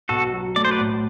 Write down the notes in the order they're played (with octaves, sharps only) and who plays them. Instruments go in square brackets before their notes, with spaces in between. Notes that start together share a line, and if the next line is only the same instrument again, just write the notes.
[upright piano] B1 [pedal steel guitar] F#4 A4
[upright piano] F#3
[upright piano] A3 [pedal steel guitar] D5
[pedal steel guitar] C5
B4 D5
[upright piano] A2